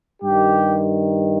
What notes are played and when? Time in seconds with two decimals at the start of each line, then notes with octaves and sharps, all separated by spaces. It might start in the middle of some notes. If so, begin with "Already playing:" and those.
0.22 G2 D#3 G4